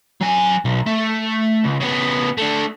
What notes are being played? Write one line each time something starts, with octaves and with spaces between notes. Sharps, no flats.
F#3 G#5
B1
A3
C#2
C#3 B3
A3 D4